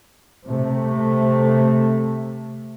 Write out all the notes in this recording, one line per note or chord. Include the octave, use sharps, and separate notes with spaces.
C3 A3